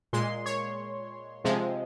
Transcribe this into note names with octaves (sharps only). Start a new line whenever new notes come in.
A#2 G#3 C6
C#5
C3 F3 G#3